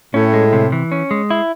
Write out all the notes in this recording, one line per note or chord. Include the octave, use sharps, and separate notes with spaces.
A2 C#4
G#3
C3
E3
C#4
G#3
E4